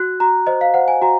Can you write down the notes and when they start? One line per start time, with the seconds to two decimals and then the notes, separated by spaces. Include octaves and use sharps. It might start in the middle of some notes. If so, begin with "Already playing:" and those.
Already playing: F#4 F#6
0.20 F#4 A#5
0.47 C5 D#5
0.61 F5
0.74 C5 F#5
0.88 G#5
1.02 F#4 A#5